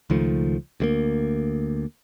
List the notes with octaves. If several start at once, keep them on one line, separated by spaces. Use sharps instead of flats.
C#2 D#3 F3 A3
D2 G#3 A#3